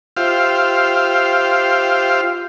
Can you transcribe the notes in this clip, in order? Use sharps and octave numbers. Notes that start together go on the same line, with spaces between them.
F4 G4 C5 E5 F5